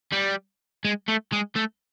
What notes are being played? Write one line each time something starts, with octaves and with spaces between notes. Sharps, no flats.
G3
G#3
A3
G#3
A3